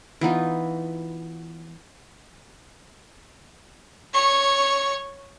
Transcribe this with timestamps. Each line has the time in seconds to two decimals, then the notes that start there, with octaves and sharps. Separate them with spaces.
0.21 E3 B3 D#4 F4
4.13 C#5 C#6